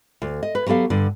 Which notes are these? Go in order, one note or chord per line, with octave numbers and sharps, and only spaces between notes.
D2
D#5
B4
F#3 B3 G4 A4 F5
G2 D3